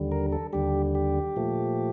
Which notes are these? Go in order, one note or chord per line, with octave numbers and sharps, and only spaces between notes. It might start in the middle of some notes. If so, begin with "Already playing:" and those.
Already playing: D#2 D3 G3
A#4
A4
D#2 D3 G3 G4
G4
A#2 F3 A3